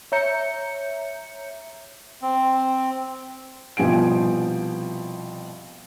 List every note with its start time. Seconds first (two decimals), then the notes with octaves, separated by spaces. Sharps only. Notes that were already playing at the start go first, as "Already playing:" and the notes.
0.12 C#5 E5 A#5 G6 C#7
2.22 C4
3.77 C2 B2 F3 G4 G#5 D7